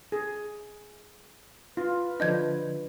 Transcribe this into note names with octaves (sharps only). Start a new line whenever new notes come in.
G#4
F4 B4
D3 F3 D4 D#5 G6 G#6